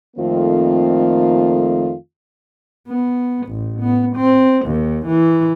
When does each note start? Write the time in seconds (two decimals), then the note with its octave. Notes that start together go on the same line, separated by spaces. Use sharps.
0.17 F2 D#3 A3 A#3 C4 F4
2.88 B3
3.48 A1
3.80 B3
4.16 C4
4.66 D#2
5.07 E3